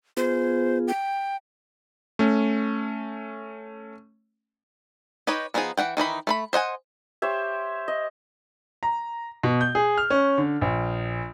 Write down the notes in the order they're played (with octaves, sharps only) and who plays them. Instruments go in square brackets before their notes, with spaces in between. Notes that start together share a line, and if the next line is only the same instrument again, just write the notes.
[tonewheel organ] B3 F4 G#4 [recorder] C5
[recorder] G5
[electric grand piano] A3 C#4
[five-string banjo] D#4 G4 B4 C#5 D#5
F3 B3 D#4 F4 G#4
E3 F4 F#5 G5
D#3 E3 D#4 B5
A3 C5 B5
C5 D#5 F#5 G#5
[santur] G4 C5 C#5 E5
D#5
[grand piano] A#5
B2
G6
G#4
F6
C#4
D3
A#1